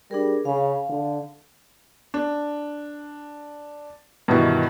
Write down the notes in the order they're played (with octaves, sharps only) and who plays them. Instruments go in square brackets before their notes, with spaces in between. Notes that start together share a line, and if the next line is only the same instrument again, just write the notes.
[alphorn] G3 [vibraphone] D4 G#4 A#4
[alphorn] C#3 [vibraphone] F5
[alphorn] D3
[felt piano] D4
G2 B2 D#3 E3 E4 F#4